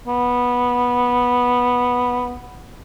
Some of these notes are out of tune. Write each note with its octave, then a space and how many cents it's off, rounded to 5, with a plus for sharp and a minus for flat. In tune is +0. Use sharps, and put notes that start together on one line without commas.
B3 -10